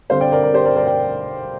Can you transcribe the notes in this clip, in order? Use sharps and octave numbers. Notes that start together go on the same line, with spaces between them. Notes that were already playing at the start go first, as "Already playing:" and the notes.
D3 G3 C4 C5 F5
D5 G5
A#4 D5
A#4 D5
G4 C5
A#4 D5
A#4 D5
D5 G5